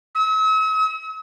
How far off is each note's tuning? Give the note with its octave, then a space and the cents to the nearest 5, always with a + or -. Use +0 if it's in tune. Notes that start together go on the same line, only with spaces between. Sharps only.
E6 -45